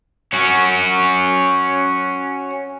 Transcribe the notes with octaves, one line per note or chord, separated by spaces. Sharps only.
C#4 F#4